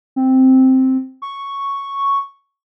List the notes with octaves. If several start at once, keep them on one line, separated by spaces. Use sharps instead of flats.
C4
C#6